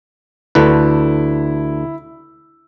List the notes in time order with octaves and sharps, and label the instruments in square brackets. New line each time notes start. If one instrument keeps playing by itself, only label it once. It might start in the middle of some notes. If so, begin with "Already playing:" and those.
[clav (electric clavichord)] D2 D3 B4 [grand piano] E4